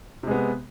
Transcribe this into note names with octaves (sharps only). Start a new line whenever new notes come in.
C3 G#3 B3